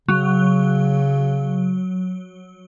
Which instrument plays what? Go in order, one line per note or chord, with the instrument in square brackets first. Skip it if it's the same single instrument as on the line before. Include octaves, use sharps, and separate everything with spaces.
[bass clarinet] C#3 [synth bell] F#3